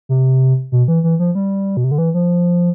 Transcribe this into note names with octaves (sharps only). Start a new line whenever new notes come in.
C3
B2
E3
E3
F3
G3
B2
C3
D3
E3
F3